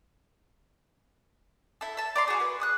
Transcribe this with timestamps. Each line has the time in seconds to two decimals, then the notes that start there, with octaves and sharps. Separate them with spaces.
1.81 E4 A4
1.97 E5 A5
2.16 D5 A#5 C6
2.28 F#4 G#4
2.40 B4
2.60 G#4 D#6 F#6